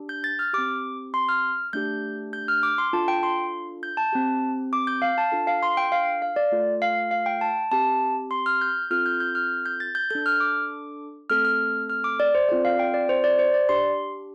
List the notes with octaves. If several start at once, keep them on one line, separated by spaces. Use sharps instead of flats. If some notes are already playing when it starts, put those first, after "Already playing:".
Already playing: D4 G4
G6
A6
F6
C4 G4 D6
C6
F6
A3 D4 G4 G6
G6
F6
D6
C6
D4 F4 A4 A5
G5
C6
G6
A5
C4 G4
D6
G6
F5
A5
D4 F4 A4
F5
C6
G5
F5
F5
D5
A3 F4 A4
F5
F5
G5
A5
C4 G4 A5
C6
F6
G6
C4 F4 A4 F6
G6
G6
F6
G6
A6
G6
D4 A4 G6
F6
D6
A3 C4 A4 F6
F6
F6
D6
D5
C5
C4 F4 A4 D5
F5
G5
D5
C5
D5
C5
D5
D4 G4 C6